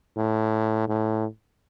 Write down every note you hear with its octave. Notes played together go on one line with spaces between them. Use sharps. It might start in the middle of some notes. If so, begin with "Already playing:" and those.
A2
A2